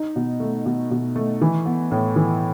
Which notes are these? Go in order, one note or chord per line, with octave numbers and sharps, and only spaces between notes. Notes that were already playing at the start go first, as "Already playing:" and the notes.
Already playing: D#4
B2
A3
B2
B2
A3
E3
B3
A2
E3